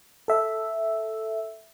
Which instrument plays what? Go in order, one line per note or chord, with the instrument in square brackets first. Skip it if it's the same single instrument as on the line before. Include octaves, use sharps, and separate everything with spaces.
[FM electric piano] A4 E5